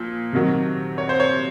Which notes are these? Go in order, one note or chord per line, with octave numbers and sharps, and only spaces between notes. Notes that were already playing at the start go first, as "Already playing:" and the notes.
Already playing: A#2 F3
C3 D#3 F#3
C#5
C5
C#5